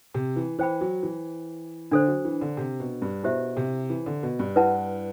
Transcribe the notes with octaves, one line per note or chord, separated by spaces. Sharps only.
C3
E3
E3 C5 G5 B5
F#3
E3
D3 D4 A4 C5
F#3
E3
D3
C3
B2
G2
B2 E4 G4 C5 E5
C3
E3
D3
B2
G2
E4 B4 F#5 A5